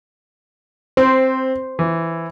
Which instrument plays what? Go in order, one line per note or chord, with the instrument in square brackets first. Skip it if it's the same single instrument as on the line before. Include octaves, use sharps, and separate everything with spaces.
[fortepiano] C4 [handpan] C5
[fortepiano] E3